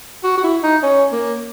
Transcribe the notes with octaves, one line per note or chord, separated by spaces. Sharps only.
F#4
F#4
E4
D#4
C#4
A#3